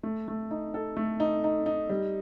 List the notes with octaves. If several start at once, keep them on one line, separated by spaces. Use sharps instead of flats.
A3
A3
D#4
A4
A3
D#4
D#4
D#4
G3